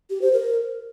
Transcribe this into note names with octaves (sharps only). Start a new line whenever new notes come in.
G4
C5
A#4